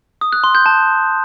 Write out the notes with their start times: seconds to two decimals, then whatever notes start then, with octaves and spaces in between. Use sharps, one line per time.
0.21 D#6
0.33 F#6
0.44 C6
0.55 G6
0.66 A5